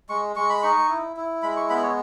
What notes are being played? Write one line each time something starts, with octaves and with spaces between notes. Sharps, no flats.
G#3 C#6
G#3 C#6
B5
D#4 C#6
E4
E4
G#3 B5
C#6
B3 B5
C#5